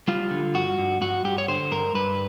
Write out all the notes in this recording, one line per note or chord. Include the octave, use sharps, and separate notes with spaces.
G3 F4
D3
G2 F#4
G2
G2 F#4
G2 G4
C#5
D3 C5
G2 A#4
G2 B4